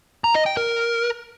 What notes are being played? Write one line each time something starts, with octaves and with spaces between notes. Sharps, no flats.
A#5
D#5
G5
A#4